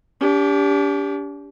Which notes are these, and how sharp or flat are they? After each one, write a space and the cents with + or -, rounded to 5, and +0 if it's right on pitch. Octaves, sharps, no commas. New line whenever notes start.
D4 -40 G4 +10